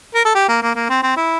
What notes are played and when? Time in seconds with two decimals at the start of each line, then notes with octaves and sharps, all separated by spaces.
0.15 A#4
0.25 A4
0.35 G4
0.48 A#3
0.62 A#3
0.75 A#3
0.89 C4
1.03 C4
1.17 E4